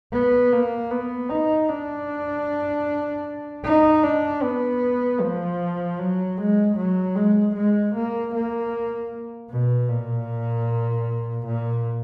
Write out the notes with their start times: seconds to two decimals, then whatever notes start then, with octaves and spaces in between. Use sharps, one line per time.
0.13 B3
0.52 A#3
0.90 B3
1.29 D#4
1.69 D4
3.64 D#4
4.04 D4
4.42 B3
5.20 F3
5.99 F#3
6.37 G#3
6.77 F#3
7.16 G#3
7.55 G#3
7.95 A#3
8.34 A#3
9.51 B2
9.89 A#2
11.46 A#2